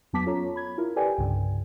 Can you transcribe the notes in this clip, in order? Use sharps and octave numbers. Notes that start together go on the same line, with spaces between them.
F2 F#3 B3 A5 D6 B6
C#4 F4 A4 C#5 A#5
B5 G#6
E4 F4 A#4
G4 A4 B4 D5 G5 G#5
C2 G2 C#3